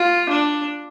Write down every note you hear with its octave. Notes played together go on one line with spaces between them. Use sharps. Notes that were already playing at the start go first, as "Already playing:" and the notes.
Already playing: F4
D4